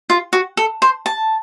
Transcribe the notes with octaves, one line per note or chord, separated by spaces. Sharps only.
F4
F#4
A4
C5
A5